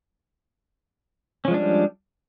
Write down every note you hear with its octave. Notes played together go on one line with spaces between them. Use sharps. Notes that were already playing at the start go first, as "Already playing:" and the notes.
F3 G3 G#3 C#4 D4